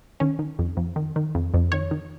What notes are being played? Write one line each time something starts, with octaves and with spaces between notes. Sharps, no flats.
D#3 C#4
D#3
F2
F2
D#3
D#3
F2
F2
D#3 C#5
D#3